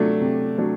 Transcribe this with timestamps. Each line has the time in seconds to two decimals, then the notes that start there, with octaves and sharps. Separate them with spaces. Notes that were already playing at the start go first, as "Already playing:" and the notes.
Already playing: C3 F#3 A3 D4
0.21 C3
0.58 F#3 A3 D4